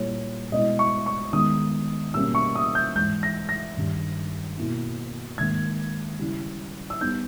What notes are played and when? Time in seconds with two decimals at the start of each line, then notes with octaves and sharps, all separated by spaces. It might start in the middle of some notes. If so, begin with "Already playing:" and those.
Already playing: A#2 G3 A#3 E4 C#5
0.52 B2 G#3 B3 E4 D#5
0.79 C#6
1.06 C#6
1.33 D#3 G#3 B3 D#4 D#6
2.14 B2 G3 A#3 C#4 E6
2.35 C#6
2.55 D#6
2.75 G6
2.95 G#2 E3 G#3 G6
3.23 A#6
3.49 A#6
3.77 G2 D#3 G3
4.57 B2 A#3 E4
5.38 G#2 D#3 A#3 G#6
6.19 C#3 G3 C#4 E4
6.90 E6
7.01 G3 B3 D#4 G6